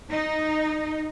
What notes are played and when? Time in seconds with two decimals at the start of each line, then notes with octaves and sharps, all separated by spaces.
0.11 D#4